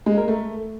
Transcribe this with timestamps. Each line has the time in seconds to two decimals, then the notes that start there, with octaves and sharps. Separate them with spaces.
0.06 G#3
0.17 A#4
0.28 A3